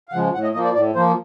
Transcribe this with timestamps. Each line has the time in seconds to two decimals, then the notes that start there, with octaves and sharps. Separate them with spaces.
0.09 F5
0.12 C#3 F3 G#3 F#5
0.34 A2 F#5
0.43 D#5
0.54 F3 A#3 D#5
0.64 D5
0.74 A2 D5
0.95 F3 A#3 C5